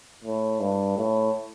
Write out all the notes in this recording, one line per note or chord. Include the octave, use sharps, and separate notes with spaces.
A2
G2
A2